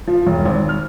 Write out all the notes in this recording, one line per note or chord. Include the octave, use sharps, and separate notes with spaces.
F3
E1
G#1
F6